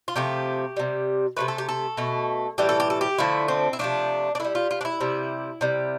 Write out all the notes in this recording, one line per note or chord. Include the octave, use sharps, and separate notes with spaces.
F4
C3 F3 A3 G4
C3 G3
C3 F3 A3 B4
A4
G4
A4
B2 A3
A2 E3 G3 G4
A4
G4
A4
G4
D3 F3 A3 E4
C4
E4
C3 F3 A3 D4
D4
D3 G3 E4
F4
F4
D4
E4
C3 G3
C3 G3